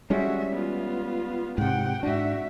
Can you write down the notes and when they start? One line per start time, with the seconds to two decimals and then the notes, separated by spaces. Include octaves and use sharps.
0.10 G3 G#3 C#4 F#4 E5
0.53 B3 F4
1.58 G#2 C3 F#5 G5
2.03 G#2 D4 F#4 E5